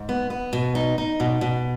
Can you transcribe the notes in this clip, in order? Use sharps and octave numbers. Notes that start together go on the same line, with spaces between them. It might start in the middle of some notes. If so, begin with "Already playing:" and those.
Already playing: G#2
B3
B3
B2
D#4
D#4
B2
B2